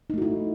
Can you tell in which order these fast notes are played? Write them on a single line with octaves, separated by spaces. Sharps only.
D#4 A3 F#4 E4